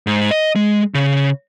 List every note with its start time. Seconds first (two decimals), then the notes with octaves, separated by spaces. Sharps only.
0.07 G#2
0.31 D#5
0.56 G#3
0.95 C#3